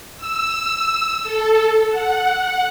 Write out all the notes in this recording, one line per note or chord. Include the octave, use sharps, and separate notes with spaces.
E6
A4
F#5